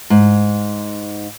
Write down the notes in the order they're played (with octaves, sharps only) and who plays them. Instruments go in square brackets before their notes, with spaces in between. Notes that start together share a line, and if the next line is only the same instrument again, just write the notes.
[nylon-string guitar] G#2